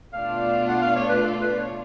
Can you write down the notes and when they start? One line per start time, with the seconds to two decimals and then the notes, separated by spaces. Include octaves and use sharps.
0.13 B2 A3 D4 F4 F5
0.68 F#5
0.82 F5
0.96 C#5
1.09 B4
1.23 A4
1.41 B4
1.59 C#5